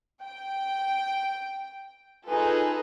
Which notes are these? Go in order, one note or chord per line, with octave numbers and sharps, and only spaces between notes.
G5
D#4 F4 G#4 A4 B4